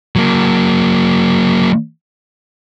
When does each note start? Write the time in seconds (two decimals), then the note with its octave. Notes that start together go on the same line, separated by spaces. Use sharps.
0.16 F#3 A#3